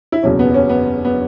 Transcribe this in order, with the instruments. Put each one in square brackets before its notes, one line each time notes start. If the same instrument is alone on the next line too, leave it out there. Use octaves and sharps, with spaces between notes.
[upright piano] E4
F#1 E2 B2 F#3 C#4
B3
C#4
B3
B3